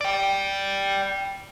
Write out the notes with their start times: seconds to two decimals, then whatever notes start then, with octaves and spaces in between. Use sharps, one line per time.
0.01 D5 G5